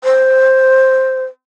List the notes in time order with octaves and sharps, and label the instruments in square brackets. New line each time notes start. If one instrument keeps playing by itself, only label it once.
[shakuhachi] C5